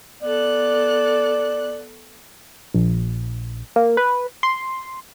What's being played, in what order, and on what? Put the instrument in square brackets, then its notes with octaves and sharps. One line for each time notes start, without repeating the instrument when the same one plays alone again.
[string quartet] B3 A4 F#6 [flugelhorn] D5
[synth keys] A#1
A#3
B4
C6